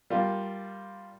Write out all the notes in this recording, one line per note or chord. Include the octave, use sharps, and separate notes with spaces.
G3 A#3 F4